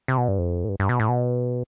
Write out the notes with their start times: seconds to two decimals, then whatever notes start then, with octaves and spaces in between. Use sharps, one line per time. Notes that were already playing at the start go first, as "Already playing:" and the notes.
0.08 C3
0.18 B2
0.28 G2
0.38 F2
0.64 A2
0.69 G2
0.80 G2
0.89 B2
1.00 A2
1.09 B2